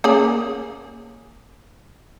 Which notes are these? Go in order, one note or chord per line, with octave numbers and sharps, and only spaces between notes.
A#3 C#4 G#4